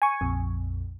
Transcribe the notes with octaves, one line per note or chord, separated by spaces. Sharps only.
G#5 C#6
A#1 F2